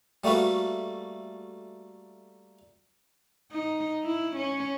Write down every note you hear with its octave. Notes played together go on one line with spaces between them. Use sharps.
G3 A3 A#3 F#4 B4
D#4
E4
C#4